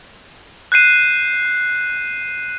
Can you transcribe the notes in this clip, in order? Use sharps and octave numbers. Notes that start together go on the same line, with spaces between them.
F#6 G6 C7 D#7 E7